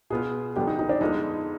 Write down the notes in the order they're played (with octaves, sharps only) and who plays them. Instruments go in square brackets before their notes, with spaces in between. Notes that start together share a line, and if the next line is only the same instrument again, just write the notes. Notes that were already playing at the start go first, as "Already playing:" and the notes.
[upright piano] B2 B3 F4 [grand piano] G#4
[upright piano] G1 G2 D3 F3 B3 [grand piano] G4
[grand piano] D#4
D#4
D4
[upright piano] F2 D3 G#3 B3 F4 [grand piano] D#4